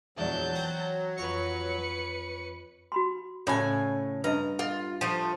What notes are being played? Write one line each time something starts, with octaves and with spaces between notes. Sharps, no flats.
A#1 E2 G#2 E3 F#3 D5 A5 G6
C4 F#5 G5
F2 B4 C#5 C#6 C#7
F#4 B5 C6
A2 C#3 F#4 A4 C#5 D5 G#5 B5
G2 B4 D#5 E5 A#5
F4 A4 E5
F3 A3 C5